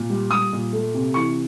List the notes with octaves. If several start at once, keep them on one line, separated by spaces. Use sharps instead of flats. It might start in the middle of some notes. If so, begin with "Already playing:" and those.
Already playing: A#2
G3
G3 D#6
A#2
A3
C3
E3 C#6